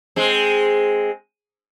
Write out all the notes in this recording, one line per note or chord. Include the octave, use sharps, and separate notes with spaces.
G#3 C4